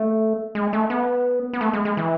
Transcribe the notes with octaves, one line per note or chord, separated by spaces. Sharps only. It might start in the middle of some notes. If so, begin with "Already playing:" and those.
Already playing: A3
G#3
A3
B3
B3
A3
G#3
G#3
E3